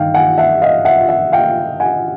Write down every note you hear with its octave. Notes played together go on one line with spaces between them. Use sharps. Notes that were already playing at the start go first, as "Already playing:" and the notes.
Already playing: G2 D#3 F5 G5
F#5 G#5
E5 F#5
D#5 F5
E5 F#5
E5 F#5
F5 G5
F#5 G#5